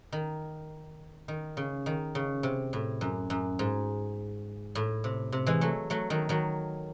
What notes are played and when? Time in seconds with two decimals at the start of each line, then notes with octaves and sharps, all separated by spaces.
0.13 D#3
1.28 D#3
1.57 C#3
1.86 D#3
2.15 C#3
2.43 C3
2.73 A2
3.01 F#2
3.30 F#2
3.59 G#2
4.75 A2
5.04 C3
5.32 C3
5.47 E3 G#3
5.61 F#3 A3
5.90 F#3 A3
6.10 D#3 F#3
6.29 D#3 F#3